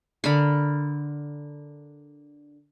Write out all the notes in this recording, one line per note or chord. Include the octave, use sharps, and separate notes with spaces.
D3 A#4 B5